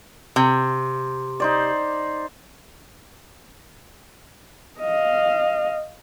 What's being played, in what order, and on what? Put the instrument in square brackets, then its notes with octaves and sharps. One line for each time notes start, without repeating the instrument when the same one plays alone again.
[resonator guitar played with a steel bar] C3
[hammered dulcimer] D#4 C5 D5
[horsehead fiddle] D#5 F5